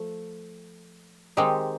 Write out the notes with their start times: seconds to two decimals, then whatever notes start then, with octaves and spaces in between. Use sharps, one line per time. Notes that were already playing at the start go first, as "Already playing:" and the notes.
Already playing: F3 A3
1.37 D#3 G#3 C4 D#4 G4